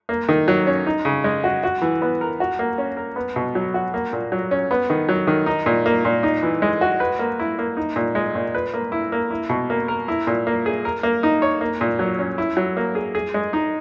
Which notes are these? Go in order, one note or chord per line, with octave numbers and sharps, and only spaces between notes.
A#3
D#3
F#3
C#4
D#4
C#3
G#3
F#4
F#4
E3
B3
A#4
F#4
A#3
C#4
A#4
B3
B2
F#3
F#4
A#3
A#2
F#3
C#4
B3
D#3
F#3
D#3
D#4
A#2
A#3
A#2
D#4
E3
G#3
F#4
B4
A#3
E4
A#3
D#4
A#2
G#3
A#2
B4
A#3
E4
A#3
E4
B2
A#3
A#4
E4
A#2
A#3
G#4
A#4
A#3
D#4
C#5
A#3
A#2
F#3
C#4
E4
F#3
A#3
G#4
G#4
G#3
D#4